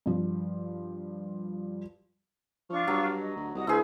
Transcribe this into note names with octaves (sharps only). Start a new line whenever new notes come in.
G2 F3
F3 D4 F4 C#6
G2 F#3
D#5
D2
C2 F#4 D#5 D#6
D2 E4 G#4 B4 C5